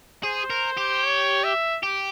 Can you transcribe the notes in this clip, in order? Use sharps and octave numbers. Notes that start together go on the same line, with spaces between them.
G#4 C5
A#4
G4
C#5
E5
G4